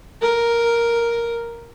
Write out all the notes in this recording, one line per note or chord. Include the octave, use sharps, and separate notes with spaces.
A#4